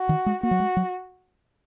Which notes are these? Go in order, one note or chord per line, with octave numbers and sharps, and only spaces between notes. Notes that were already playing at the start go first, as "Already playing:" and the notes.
Already playing: F#4
D#3
G#3
A#3 F#4
F#3
G#3
F#3